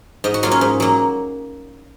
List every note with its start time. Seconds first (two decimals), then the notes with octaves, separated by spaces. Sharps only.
0.24 G#2 D#5
0.34 F#4
0.43 F#3 A#3 F4
0.51 C#4
0.61 G#2
0.80 F#3 A#3